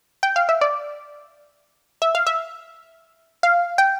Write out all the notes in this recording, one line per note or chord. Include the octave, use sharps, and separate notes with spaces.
G5
F5
E5
D5
E5
F5
E5
F5
G5